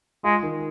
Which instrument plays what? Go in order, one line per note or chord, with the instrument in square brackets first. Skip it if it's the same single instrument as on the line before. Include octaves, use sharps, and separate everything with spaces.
[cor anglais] G#3 [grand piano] F4
[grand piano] D#3